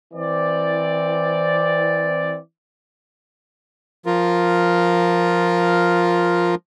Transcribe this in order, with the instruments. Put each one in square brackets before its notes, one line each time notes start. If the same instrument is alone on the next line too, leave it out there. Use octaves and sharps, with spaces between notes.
[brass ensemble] E3 C4 D5
[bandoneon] F3 F4 A#4